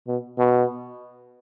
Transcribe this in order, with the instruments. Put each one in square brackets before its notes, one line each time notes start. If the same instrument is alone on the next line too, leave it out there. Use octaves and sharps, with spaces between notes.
[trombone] B2
B2